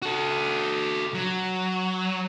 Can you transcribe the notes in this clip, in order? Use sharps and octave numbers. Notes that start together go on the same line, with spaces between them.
F#4 A4
F#3